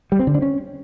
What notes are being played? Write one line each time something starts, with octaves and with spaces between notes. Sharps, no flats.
G3
C4
D3
D4
C#4